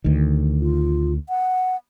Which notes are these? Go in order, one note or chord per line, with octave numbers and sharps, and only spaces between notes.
D2 D#3
F4
F#5